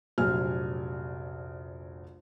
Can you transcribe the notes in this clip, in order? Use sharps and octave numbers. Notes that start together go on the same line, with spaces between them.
F1 A#1 F#3 G#5 F6